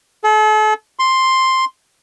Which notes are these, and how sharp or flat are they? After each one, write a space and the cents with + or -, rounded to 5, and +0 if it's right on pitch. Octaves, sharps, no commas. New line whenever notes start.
A4 -40
C6 +5